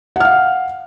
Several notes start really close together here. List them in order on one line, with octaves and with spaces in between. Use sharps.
F#5 F6 F5